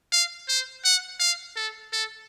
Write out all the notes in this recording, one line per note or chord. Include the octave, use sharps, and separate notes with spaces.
F5
C5
F#5
F5
A4
A4